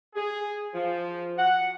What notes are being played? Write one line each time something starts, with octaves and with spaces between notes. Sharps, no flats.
G#4
F3
F#5